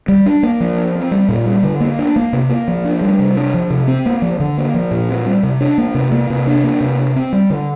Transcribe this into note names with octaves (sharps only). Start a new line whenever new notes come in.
G3
D4
A#3
F3
D4
C4
G3
A#2
G3
D3
A#3
D4
A#3
C3
A#3
F3
D4
G3
C3
D4
F3
C3
C4
A#3
F3
D3
A#3
F3
A#2
C4
G3
C3
D4
A#3
C3
A#3
C3
D4
A#3
C3
D4
C4
G3
D3